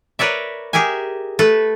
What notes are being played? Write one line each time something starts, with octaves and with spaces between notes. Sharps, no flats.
A#4 B4 C#5 D5 E5
G4 G#4 A#4 E5 G#5
A3 A4 B4